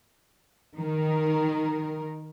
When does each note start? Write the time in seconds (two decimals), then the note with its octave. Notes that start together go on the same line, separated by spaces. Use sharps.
0.78 D#3 A#4